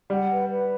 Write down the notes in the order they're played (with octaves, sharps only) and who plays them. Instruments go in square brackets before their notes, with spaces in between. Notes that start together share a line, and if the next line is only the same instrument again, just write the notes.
[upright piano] G3 [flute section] F#5
[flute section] B4
B4